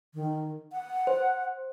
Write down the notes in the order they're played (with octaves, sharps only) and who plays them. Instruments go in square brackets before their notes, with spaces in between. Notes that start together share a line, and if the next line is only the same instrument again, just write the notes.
[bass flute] D#3
F#5
[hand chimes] C5